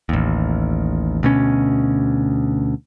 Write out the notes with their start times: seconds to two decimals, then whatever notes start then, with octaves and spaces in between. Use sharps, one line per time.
0.09 A1 D#2
1.23 D2 B2 C#4